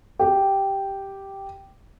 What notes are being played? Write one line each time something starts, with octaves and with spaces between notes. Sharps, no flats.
G4